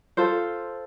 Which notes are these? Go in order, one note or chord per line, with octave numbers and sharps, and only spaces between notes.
F4 A4 C5